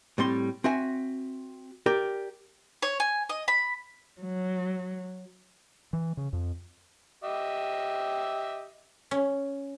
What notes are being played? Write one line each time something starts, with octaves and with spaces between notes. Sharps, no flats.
A2 G3 C4 C6
C4 F#4 E5 G#5
G4 A#4 D5
C#5
G#5
D#5
B5
F#3
E3
C#3
F2
G4 D#5 E5
C#4